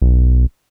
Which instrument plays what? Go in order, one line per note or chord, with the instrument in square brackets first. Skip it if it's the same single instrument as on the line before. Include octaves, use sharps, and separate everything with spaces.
[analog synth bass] B1